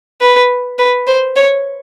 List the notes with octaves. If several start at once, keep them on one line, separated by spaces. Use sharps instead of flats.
B4
B4
C5
C#5